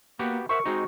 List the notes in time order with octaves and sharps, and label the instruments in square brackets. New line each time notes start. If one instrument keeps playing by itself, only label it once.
[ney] A#3 [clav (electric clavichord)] B3 F#4 G4
[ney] A#4 [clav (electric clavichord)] C5 E5 F#5 [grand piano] C#6
[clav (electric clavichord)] G#3 C4 D#4 [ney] F#4